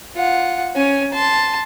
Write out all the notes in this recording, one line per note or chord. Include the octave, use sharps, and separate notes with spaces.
F4 F#5
C#4 G#5
A5 C6